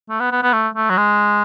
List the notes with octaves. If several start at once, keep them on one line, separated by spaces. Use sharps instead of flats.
A3
B3
B3
B3
A3
A3
F#3
G#3